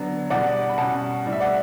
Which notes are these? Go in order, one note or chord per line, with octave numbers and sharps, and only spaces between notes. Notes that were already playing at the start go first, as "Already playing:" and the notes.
Already playing: D3 F#3 B3 D4
E2 B2 G3 D4 D5 F#5
B5
B2 G3 C#4 F#5 A5
A2 G3 D4
E5
D5 F#5